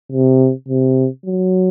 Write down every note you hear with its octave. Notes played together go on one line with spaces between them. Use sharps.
C3
C3
F#3